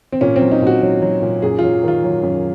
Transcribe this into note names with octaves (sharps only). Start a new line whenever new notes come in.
C4
A#2 C#4
C4
F#3
D#4
A#2
F#4
F#3
F#3
A#2
F#2 G#4
F#3 F4
D#3 F4
F#3
F#2